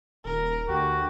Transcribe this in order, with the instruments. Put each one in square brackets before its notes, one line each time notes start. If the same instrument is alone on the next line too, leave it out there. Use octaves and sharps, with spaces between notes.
[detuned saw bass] D#1 [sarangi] A#4
[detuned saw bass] D2 [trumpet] F#4 [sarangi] G4